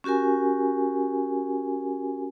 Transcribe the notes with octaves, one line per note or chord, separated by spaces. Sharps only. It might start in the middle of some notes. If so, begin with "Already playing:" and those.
C#4 F#4 G4 A#4 G#5